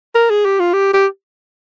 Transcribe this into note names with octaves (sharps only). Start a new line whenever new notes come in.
A#4
G#4
G4
F4
G4
G4